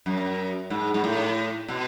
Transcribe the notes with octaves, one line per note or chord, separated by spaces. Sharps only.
F#2
G#2
G#2
A2
B2